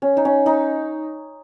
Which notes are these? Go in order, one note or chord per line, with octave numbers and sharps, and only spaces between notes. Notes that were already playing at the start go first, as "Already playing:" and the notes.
C#4
D#4
C#4
D#4